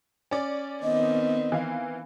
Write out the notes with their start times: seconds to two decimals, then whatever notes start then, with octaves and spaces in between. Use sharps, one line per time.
0.31 C#4 D5
0.83 D#3 B3 C4 D#5
1.52 E3 F5